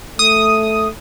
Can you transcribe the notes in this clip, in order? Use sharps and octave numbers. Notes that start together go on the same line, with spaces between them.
A3 D#6